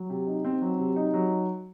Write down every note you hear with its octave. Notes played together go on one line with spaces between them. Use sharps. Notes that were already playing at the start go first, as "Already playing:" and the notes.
Already playing: F#3
C3
D#4
C4
F#3
C3
D#4
F#3